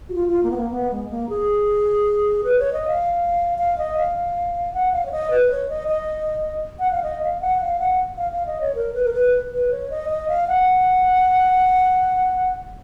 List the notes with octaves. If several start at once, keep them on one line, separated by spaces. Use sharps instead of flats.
F#4
F4
F4
A#3
B3
A#3
B3
G#3
A#3
G#4
B4
C#5
D#5
F5
F5
D#5
F5
F#5
F5
C#5
D#5
B4
C#5
D#5
D#5
F#5
F5
D#5
F5
F#5
F5
F#5
F5
F5
D#5
C#5
A#4
B4
A#4
B4
B4
C#5
D#5
D#5
F5
F#5